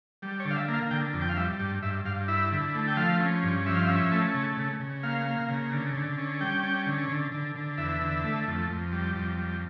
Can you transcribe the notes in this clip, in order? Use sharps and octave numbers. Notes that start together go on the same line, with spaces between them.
G3
C#5
D3
F5
E5
A#3
F5
D3 G5
F2
G5
F5
G3 E5
G2
G2 E5
G2 F5
E4 E5
D3
A3
G5
F3 F5
C#4
G2
F3 E5
F5
C#4 E5
A3
C#3
C#3
C#3
A#3 F5
A#3
C#3
D3
D3
C#4
G3 G5
C#4
D3
D3
D3
D3
E2 E5
D3
A3
F2
F2
G3
F2
G3